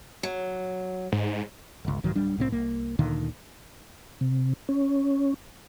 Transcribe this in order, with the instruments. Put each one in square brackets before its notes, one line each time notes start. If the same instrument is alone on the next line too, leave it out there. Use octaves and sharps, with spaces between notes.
[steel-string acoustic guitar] F#3
[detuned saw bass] G#2
[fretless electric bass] G1 C#2
B1 G#2 D#3 F#3
D1 G3 D4
C2 A2 G#3 C4
C2 A#3
D2 A#2 D3 D#3
[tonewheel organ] C3
C#4